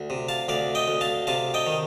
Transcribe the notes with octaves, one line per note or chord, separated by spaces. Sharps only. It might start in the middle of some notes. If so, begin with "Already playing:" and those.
Already playing: D2
C3
F5 A5
D2 D5 F5
D#5 G5
D2
F5 A5
C3 F5 A5
D#5 G5
D#3